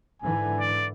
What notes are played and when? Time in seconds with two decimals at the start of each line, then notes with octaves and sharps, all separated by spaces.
0.22 G#2 D3 E3 G#5
0.60 D5